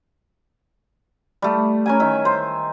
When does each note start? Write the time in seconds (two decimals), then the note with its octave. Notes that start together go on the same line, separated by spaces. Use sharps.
1.42 G3 A3
1.86 C#4 A#4 G#5
2.00 D#3 E5
2.25 C5